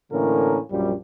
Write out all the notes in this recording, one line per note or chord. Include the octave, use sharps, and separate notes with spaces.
A2 D3 E3 A#3 C#4 A#4
A#1 F#2 F3 G3